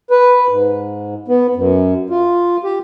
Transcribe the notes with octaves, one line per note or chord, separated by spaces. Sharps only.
B4
G#2
B3
F#2
F4
G4